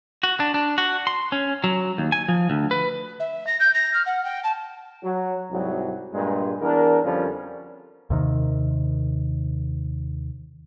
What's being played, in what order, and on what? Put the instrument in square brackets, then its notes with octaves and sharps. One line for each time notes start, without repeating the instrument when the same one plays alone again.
[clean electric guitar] F#4
D4
D4
F#4
C6
C#4
F#3
D#2
G#5
F3
D2
B4
[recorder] E5
A#6
G6
A#6
F6
F#5
G5
A5
[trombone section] F#3
C2 G#2 F#3
G2 A#2 G#3
E2 D4 A#4
F2 D3 F3 G3 C#4
[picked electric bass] D#2 C3 D#3